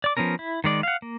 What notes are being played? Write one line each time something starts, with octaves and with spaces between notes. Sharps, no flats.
D5 D6
F3 A#3 B3 C#4 A#4
E4
D#3 G#3 D5
F5 F#5
A#3